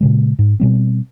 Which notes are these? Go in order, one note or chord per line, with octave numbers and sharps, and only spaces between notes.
A#2 C#3 G#3
G#2
B2 G3 C4